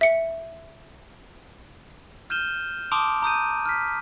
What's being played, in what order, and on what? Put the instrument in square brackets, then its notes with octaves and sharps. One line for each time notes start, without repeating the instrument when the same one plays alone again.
[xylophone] E5 C#7
[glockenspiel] F6 G6 D#7 E7 G7
A5 C6 D6 D#6 D7 F7
A#5 D#6 G6 D#7
F6 B6